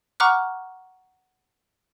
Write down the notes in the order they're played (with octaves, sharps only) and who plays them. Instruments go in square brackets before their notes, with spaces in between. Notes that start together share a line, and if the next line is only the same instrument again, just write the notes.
[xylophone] F#5 A#5 C#6 D6 F6 F#6